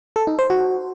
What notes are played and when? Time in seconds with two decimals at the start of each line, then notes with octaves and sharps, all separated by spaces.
0.16 A4
0.27 D#4
0.39 C5
0.50 F#4